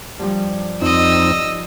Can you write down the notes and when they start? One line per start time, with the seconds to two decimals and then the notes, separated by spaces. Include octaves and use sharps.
0.19 G2 F3 G3
0.82 F2 C4 D#4 D#5 E6